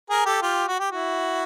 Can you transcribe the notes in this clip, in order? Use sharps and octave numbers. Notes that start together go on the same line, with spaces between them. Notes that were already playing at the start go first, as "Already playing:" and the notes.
G#4 A#4
G4 A4
F4 G4
F#4
G4
E4 F#4